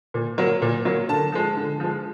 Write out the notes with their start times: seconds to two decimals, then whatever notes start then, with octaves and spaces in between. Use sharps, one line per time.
0.14 A#2
0.38 F#3 A#3
0.62 A#2
0.85 F#3 A#3
1.09 D3 A5
1.32 F3 G#3
1.56 D3
1.80 F3 G#3